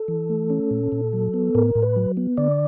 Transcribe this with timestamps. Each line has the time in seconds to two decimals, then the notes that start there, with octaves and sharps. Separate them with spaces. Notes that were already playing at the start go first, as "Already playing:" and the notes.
Already playing: A4
0.08 E3
0.30 A3
0.50 C#4
0.71 A#2
0.92 A#2
1.13 F#3
1.34 B3
1.55 A2 A#4
1.75 A2
1.82 B4
1.96 F#3
2.17 B3
2.37 D3 D5